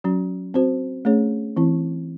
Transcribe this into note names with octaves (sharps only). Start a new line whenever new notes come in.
F#3 C#4 F#4
C4 F#4 C5
A3 C#4 G#4 C#5
E3 C4 E4